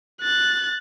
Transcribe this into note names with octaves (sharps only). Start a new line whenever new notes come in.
F#6 A6